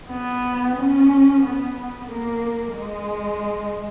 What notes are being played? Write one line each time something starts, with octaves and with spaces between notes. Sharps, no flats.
B3
C#4
B3
A#3
G#3